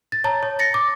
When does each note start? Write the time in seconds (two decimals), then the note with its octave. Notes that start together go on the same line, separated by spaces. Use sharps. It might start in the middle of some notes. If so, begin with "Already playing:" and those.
0.12 A6
0.24 C#5 A5 A#5
0.43 C#5
0.59 A6 A#6 C#7
0.74 D6